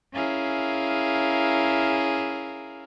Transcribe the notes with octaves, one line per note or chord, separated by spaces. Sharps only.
C#4 E4 G#4 A#4 E5 F5